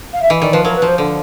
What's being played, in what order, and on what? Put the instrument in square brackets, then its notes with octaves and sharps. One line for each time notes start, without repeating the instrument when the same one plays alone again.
[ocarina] F5
E5
[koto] E3 [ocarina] D#5
[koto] D#3 [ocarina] D5
[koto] F3 [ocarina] B4
[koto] F#3 [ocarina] A#4
[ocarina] B4
[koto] F3 [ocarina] C5
[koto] D3